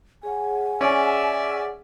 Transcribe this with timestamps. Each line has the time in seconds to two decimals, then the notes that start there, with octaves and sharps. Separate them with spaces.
0.23 G#4 C#5 F#5 G#5
0.81 C#4 D5 E5